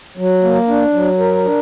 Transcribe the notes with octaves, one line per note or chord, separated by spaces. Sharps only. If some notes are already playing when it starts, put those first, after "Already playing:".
F#3
A#3
D4
F#3
A#4
D4